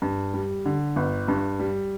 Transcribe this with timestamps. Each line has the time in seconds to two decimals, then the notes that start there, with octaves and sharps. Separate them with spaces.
0.02 G2
0.34 G3
0.66 D3
0.96 G1
1.28 G2
1.60 G3